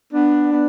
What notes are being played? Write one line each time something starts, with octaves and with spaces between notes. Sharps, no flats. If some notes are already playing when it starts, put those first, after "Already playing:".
B3 D4
B3